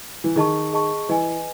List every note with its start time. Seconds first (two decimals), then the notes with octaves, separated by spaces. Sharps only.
0.24 E3
0.36 D#3 G#4 D#5 A5 C#6
0.73 G#4 D#5 A5 C#6
1.09 E3 B4 D#5 G#5